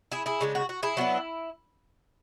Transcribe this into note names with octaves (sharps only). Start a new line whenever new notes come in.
E4 G#4
E4 G#4
C#3 G#3 D4
F#4
F#4
E4 G#4
F#3 B3 D4